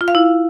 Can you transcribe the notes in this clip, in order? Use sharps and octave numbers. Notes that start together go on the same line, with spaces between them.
F4
F5
E4